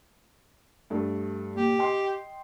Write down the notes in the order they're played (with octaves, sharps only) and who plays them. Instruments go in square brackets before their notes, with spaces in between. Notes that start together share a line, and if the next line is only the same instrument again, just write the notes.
[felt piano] G2 A3
[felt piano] A#2 [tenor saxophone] G4
[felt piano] D#5 G5 C6